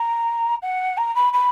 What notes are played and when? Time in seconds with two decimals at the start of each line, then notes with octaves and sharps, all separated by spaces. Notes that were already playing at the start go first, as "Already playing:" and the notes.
Already playing: A#5
0.63 F#5
0.98 A#5
1.16 B5
1.33 B5